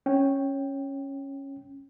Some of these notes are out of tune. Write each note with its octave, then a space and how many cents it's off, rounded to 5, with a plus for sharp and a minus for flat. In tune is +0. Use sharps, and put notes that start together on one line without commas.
C#4 -10 G5 +0